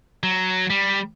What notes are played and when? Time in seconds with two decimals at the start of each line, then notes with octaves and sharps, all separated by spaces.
0.23 F#3
0.70 G3